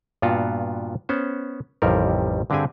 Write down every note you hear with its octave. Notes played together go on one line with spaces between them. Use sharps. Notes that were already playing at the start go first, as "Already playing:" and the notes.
G2 A#2 B3 F4 F#4
B3 C#4 C5
A1 F2 C3 D#3 G3 A#4
G2 D3 C4 G4 G#4 G#5